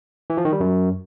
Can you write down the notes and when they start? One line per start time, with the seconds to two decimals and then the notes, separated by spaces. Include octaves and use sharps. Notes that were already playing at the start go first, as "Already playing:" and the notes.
0.30 E3
0.37 F3
0.45 D#3
0.53 G3
0.60 F#2